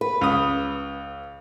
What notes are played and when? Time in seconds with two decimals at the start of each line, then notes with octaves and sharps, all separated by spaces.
0.01 B4
0.21 C#2 D#6